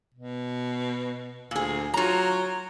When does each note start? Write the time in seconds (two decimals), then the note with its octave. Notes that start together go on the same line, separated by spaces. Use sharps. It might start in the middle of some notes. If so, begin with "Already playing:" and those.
0.14 B2
1.51 D2 A#2 G#4
1.94 F#3 F4 A#5